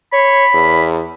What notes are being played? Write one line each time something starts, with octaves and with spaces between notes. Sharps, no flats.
C#5 B5
E2